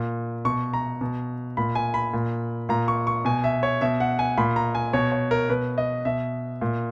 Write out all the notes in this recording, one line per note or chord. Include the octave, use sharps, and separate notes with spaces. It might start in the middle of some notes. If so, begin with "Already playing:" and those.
Already playing: A#2
B2 C#6
A#5
B2
A#2 B5
G#5
B5
A#2
A#2 A#5
C#6
C#6
B2 G#5
E5
C#5
B2 E5
F#5
G#5
A#2 B5
A#5
G#5
B2 C#5
C#5
A#4
B2 B4
D#5
B2 E5
A#2